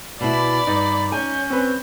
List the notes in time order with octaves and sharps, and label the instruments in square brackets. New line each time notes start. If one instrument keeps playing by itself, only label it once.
[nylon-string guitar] B2 E4 [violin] D5 [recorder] B5
[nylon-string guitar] G2 [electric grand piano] D#4
[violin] C#4 [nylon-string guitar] G#5 [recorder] G6
[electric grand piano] C4 B4